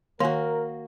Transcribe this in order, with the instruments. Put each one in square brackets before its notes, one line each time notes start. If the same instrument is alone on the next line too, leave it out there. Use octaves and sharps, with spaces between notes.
[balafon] D#3 G#5 [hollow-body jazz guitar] A#3 F#4 [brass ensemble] A#4